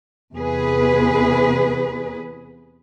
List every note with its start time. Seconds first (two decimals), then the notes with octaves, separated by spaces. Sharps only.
0.34 E2 C3 G#4 B4